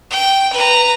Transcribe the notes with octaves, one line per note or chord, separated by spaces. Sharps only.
G5
B4 A#5